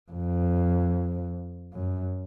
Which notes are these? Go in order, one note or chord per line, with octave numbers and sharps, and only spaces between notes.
F2
F#2